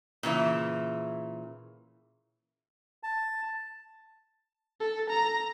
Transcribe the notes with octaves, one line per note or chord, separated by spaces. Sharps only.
A#2 C#3 E3 E5
A5
A4
A#5